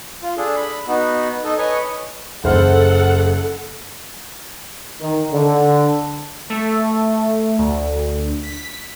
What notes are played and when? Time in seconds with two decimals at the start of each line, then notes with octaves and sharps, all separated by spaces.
0.22 F4
0.37 D4 G#4 A4
0.57 B5
0.88 B3 D#4 F#4
1.44 D#4 A4 D#5
1.58 B4 C#5 D#5 G#5 C#6
2.44 F#1 A4 C5 F#5 F6
5.01 D#3
5.33 D3
6.50 A3
7.59 D2
8.43 B6